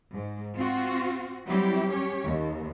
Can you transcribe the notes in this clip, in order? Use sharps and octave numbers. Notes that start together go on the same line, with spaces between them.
G#2
C4 F4 F#4
F#3 G3 C4 E4 G4
C#4 G4 C#5
D#2